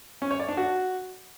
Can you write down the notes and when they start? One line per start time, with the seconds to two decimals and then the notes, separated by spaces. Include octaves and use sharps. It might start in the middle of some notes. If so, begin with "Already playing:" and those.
0.22 C#4
0.31 C#5
0.40 D5
0.48 D4
0.57 F#4